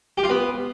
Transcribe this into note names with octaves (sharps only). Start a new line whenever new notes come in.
G4
F4
B3